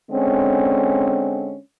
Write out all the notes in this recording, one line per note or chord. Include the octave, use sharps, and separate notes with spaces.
D3 G#3 C4 C#4